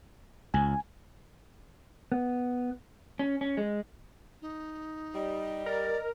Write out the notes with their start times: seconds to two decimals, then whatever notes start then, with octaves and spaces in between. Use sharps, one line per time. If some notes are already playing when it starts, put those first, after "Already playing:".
0.54 C#2 G#5
2.12 B3
3.19 C#4
3.41 C#4
3.57 G#3
4.42 D#4
5.14 G3 D#5
5.66 A#4 D5